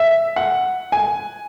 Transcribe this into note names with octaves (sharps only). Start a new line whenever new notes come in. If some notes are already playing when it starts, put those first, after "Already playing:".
Already playing: E5
F#5
G#5